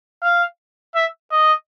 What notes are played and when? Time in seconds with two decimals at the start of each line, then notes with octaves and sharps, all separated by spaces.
0.22 F5
0.95 E5
1.31 D#5